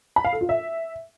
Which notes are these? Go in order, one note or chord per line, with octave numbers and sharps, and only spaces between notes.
B5
F5
A4
F4
E5